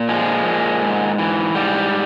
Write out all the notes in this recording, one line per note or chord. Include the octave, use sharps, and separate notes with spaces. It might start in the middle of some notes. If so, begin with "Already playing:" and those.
Already playing: A#2
F3 G#3
A#2
G#2
E3
G#2 G3